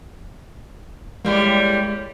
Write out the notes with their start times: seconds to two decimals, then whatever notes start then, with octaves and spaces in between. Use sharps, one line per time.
1.25 A2 G3 G#3 A#3